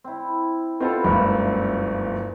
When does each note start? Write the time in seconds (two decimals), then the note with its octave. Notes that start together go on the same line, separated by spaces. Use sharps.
0.04 C4 E4
0.80 B2 C4 F4 A4 B4 E5
1.04 F#1 C#2 G2 A#2 E5